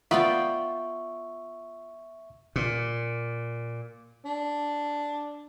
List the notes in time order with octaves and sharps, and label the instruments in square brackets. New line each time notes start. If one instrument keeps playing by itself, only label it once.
[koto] B3 [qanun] F4 D5 G5 [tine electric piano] E5 C#6
[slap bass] A#2
[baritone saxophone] D4